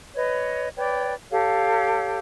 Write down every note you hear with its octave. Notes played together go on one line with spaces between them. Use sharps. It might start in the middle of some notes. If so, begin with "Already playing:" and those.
B4 C#5 D#5
B4 C#5 D5 G5
G4 A4 C#5 F5